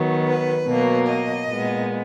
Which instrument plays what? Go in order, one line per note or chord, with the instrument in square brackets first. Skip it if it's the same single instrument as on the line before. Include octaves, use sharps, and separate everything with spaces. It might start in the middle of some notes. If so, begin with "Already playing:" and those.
Already playing: [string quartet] D#3 F#3 B3
B4
B2 F#3 A#3
D#5
A#2 G#3 B3